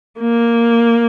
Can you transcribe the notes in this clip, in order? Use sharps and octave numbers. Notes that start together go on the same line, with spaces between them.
A#3